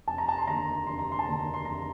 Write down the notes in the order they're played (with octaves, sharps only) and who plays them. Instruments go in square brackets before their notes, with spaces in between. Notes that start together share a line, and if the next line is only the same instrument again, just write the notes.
[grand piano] F1 A5
A#5
A5
C6
D#2 D3 A#5
F1 C6
A#5
C6
A5
D#2 D3 A#5
C6
F1 A#5